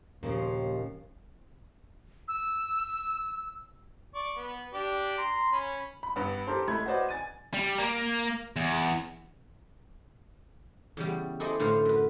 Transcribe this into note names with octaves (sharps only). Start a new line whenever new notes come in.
D#2 A#2 C#3 F3
E6
D5 C#6
B3
D4 G4 D5
A#5 C6
C#4 B5
B5
G2 B3
D4 G4 A4 A#4 C5 C6
G#3 A3 B5 G#6
F#4 B4 C5 D5 D#5
G#5 A6 D#7
G3
A#3
E2
E2 C#3 G3
E4 G#4 A4 C5 D5 D#5
A2 D3 B4 C5 F5
F#2 B4